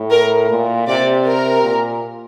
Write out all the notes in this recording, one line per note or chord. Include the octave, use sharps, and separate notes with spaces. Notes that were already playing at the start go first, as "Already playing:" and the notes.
Already playing: A2
A#4
A#2
C3 D5
A#4
A#2